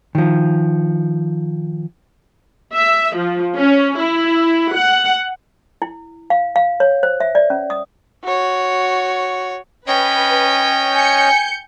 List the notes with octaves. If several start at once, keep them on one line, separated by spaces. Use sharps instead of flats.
D#3 F3
E5
F3
C#4
E4
F#5
E4
F5
F5
C#5
C5
E5
D5
C#4
D#6
F#4 C#5
C#4 B4 C#5 D#5 G5
G#5 G6 C#7